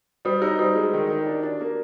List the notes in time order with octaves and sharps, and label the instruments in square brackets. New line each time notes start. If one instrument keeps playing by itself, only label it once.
[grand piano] G3 [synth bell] F#4
[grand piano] D#4 [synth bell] G4
[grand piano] G3 [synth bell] F#4
[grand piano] G#3
D#3
D#3
D4
D4
A#3